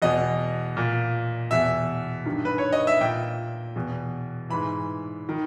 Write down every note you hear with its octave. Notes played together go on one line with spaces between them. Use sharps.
E2 B2 D#5
A#2
E2 B2 E5
G2 D#3
B4
C#5
D#5
E5
A#2 G5
E2 B2
G#2 E3 B5
D#3